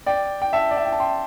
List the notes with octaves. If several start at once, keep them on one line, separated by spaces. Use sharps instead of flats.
D5 G5
G5
E5 A5
D5
E5
G5
A5
G5 C6